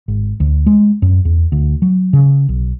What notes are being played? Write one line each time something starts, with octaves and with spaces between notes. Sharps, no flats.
G#1
D2
G#3
F#2
E2
D2
F#3
C#3
B1